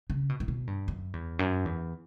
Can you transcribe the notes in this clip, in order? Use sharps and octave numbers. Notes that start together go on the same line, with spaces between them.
C#3
B2
A2
B2
G2
F#2
E2
F#2
E2